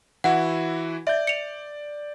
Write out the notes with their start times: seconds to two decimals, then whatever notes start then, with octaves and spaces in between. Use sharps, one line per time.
0.24 E3 E4 F#4 F#5
1.07 D5 E5 G6
1.27 C#7 F7